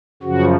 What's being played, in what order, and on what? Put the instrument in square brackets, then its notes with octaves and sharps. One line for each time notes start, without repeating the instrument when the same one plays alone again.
[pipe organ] F#2 C#3 F3 F#4